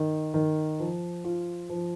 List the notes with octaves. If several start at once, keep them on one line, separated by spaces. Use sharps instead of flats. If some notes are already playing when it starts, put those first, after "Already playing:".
Already playing: D#3
D#3
F3
F4
F3